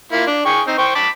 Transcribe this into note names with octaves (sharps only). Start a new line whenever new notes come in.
A#3 E4 F4
D4
G#4 G5 C#6
C4 D#4
C5 G5 C#6
A5 B5 D6